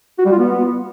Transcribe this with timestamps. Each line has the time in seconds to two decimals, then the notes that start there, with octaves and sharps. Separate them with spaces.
0.19 F#4
0.25 G3
0.32 F4
0.39 B3